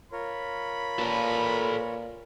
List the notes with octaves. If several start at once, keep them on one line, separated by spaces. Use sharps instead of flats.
F4 A#4 C#5 B5
A#2 A4 B4